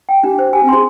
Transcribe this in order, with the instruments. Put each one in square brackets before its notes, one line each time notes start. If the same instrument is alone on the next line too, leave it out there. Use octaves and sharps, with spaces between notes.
[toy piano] G5
[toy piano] D4 [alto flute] G4
[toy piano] C5
[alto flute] G4 [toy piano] G#5
[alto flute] C4
[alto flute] G#4 [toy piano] C6